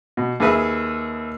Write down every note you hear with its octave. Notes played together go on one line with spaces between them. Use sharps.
B2
D#2 G#4 B4 E5